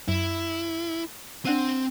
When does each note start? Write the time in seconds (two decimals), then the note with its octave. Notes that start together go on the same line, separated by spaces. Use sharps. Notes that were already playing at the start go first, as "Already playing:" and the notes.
0.08 F#2 E4
1.45 C4 D4 F#5 D#7